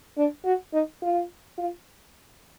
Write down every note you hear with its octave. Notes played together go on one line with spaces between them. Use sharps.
D4
F#4
D#4
F4
F4